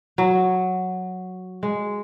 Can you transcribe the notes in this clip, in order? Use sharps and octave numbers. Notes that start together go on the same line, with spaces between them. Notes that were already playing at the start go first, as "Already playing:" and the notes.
F#3
G#3